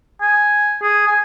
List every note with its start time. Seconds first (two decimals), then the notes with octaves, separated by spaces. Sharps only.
0.22 G#5
0.82 G#4
1.07 G#5